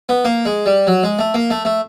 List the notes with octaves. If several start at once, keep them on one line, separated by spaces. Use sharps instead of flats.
B3
A#3
G#3
G3
F#3
G#3
A3
A#3
A3
A3